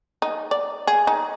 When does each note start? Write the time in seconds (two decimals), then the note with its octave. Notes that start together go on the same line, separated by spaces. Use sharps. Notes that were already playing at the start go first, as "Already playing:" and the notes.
0.22 D#4
0.51 D5
0.87 G#4
1.07 D#4